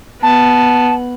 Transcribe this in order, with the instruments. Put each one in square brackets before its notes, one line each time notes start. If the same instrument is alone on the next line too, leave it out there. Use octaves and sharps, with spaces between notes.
[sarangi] B3 [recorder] A5